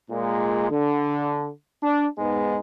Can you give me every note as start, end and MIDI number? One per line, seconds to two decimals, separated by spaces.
0.10 0.69 46
0.10 0.69 56
0.70 1.48 50
1.83 2.06 62
2.18 2.58 44
2.18 2.58 56
2.18 2.58 59
2.18 2.58 63